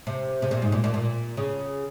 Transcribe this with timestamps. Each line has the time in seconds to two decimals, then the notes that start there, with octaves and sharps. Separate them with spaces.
0.07 C3
0.42 C3
0.51 A#2
0.62 G#2
0.72 A#2
0.84 A#2
0.94 A#2
1.37 C#3